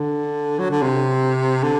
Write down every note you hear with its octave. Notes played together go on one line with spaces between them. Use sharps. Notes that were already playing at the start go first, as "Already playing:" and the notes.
Already playing: D3
F#3
D3
C3
D3